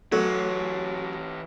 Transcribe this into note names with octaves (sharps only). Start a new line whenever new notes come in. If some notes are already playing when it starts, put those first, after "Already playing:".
E3 F#3 A3 C#5